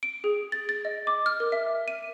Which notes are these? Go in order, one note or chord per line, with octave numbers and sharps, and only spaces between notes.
D7
G#4
A6
A6
D#5
D6
F6
A#4
E5
D#7